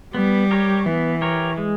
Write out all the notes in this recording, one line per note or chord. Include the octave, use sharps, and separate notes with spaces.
G3 B3
G4 A#4 C#5
E3 B3
G4 A#4 C#5
G#3